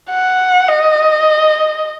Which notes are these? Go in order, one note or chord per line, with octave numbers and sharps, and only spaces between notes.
F#5
D#5